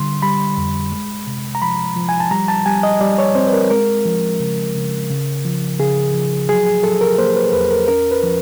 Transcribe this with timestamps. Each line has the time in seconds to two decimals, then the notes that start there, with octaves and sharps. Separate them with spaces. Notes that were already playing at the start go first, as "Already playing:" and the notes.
Already playing: D3 G3 C6
0.22 G3 B5
0.57 F2
0.92 G#3
1.27 C3
1.55 A#5
1.62 F3 B5
1.96 F3
2.09 G#5
2.20 A5
2.31 G3 A#5
2.48 A5
2.66 G3 G#5
2.83 D#5
3.01 G3 D5
3.18 C#5
3.35 C4 C5
3.47 B4
3.53 A#4
3.70 G#3 A#4
4.06 F3
4.40 C#3
4.75 C#3
5.10 C#3
5.45 F3
5.79 C#3 G#4
6.14 F3
6.49 F#3 G#4
6.66 G#4
6.83 F#3 A4
7.01 A#4
7.18 A#3 C5
7.36 B4
7.53 E2 B4
7.71 A#4
7.88 C#4 A#4
8.11 B4
8.23 F3